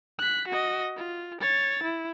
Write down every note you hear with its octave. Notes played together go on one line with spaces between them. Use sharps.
F#6 B6
F#4 D#5
F4
C#5 A6
E4